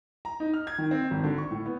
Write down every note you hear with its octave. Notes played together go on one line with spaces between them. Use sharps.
A#5
D#4
F6
G#6
D#3
C4
G#1
D3
C#6
A2
B3